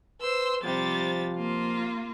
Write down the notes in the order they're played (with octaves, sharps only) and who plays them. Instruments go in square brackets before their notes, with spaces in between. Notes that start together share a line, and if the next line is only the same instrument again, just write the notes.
[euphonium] B4 [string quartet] C5 C6 E6
[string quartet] C3 G3 A6 [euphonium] F3
[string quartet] A#3 F4